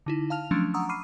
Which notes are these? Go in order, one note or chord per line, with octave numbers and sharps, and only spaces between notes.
D3 D#4 E4
F5 A5 F6 F7
F3 F#3 A3 C#4 D4
F#5 A#5 C#6 D#6 E6
B5 C#6 D6 F6 C7 D#7